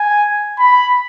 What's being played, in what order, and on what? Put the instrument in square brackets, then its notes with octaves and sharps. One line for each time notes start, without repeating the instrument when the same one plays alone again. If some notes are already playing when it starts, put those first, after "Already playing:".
Already playing: [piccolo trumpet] G#5
B5